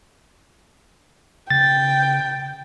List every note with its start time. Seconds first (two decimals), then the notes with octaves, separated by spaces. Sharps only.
1.50 C#3 G5 A6